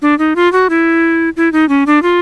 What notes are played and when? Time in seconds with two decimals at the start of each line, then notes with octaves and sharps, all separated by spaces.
0.02 D4
0.19 D#4
0.36 F4
0.53 F#4
0.70 E4
1.36 E4
1.52 D#4
1.69 C#4
1.87 D4
2.03 F4